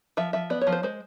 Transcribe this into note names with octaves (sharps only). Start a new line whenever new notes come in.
F3 E5
F3 E5
B3 D5
C#5
F3
C5
G#3 C5